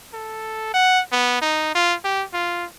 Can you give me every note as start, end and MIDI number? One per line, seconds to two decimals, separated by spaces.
0.14 0.72 69
0.74 1.01 78
1.12 1.41 59
1.41 1.75 63
1.75 1.95 65
2.04 2.24 67
2.33 2.65 65